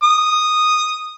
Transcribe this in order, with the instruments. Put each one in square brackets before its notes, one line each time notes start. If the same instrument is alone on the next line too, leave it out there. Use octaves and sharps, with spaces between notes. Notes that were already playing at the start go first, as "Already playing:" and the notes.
[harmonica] D#6